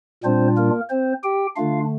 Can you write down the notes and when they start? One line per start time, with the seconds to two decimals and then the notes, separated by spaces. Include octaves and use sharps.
0.24 A#2 G3 C4 D4 F4 C5
0.57 A#3 A#4
0.90 C4 C5
1.23 G4 G5
1.56 D3 A3 D4 F4 F5